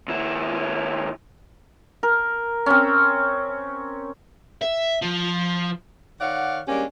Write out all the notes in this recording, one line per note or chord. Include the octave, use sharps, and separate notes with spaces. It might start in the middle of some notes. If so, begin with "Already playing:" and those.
D#2 E4
A#4
C4 C#4
E5
F3
D#3 C#5 D5 F5 F#5
G3 G#3 A#3 C#4 D4 G4